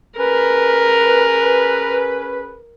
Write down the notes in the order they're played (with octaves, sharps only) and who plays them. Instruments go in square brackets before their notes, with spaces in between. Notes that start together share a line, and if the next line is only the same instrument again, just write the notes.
[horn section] C#4 G#4 B4 [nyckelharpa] A#4